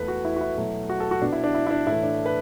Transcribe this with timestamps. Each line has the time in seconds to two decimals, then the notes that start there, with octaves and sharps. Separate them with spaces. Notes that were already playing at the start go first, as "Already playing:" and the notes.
Already playing: E2 E3 A3 B4
0.08 F#4
0.25 E4
0.37 F#4
0.41 E4
0.57 B2 F#3 A3
0.90 F#4
1.00 A4
1.11 F#4
1.22 B2 B3 D4
1.32 E4
1.44 D4
1.55 E4
1.67 E4
1.71 D4
1.86 A2 E3 A3 E4
2.03 D4
2.26 B4